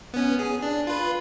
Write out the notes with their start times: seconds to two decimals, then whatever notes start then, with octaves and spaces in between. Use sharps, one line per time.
0.14 B3 C#4
0.39 G#4
0.62 D4
0.87 F4 B4